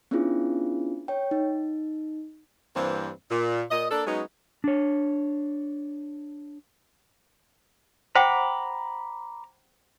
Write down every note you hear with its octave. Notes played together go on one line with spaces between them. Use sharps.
B3 C#4 D4 E4 F4 G#4
C#5 G5
D#4
G2 E3 A#3 C4
A#2
A#2 D#5
A#3 D4 A4
F#3 G#3 B3 C#4 D#4
D4 C#5
C5 F#5 G5 A#5 B5 D6